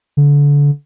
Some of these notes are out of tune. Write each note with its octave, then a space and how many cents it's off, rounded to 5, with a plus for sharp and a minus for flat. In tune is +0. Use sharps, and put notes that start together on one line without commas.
D3 -30